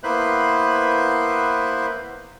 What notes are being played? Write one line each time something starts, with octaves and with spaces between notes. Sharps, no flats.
A#3 B3 E4 B4 C5 F#6